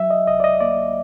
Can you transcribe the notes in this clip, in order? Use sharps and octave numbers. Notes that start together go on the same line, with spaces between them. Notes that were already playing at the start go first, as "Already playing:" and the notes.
Already playing: F#3 E5
D#5
C2 D#5
D5
D#5
A#3 D5